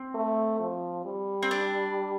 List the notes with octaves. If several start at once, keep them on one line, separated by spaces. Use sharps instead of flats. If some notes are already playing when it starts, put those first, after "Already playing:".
Already playing: C4
A3
F3
G3
C4
D4